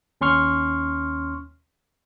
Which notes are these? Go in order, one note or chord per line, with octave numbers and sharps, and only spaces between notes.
D#2 C#4 C6 C#6 F6